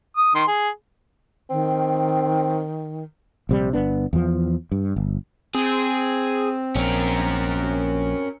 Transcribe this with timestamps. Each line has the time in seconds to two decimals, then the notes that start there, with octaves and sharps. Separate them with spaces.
0.17 D#6
0.35 D#3 C6
0.48 G#4
1.50 D#3 C4
3.49 A#1 C3 G3
3.73 G1 B3 D4
4.13 E2 F3
4.72 G2
4.96 G1
5.55 C4 G#4
6.76 A#1 C#4 A#4